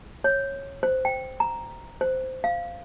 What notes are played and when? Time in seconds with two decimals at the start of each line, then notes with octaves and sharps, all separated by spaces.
0.24 C#5
0.83 C5
1.05 G5
1.40 A#5
2.01 C5
2.44 F5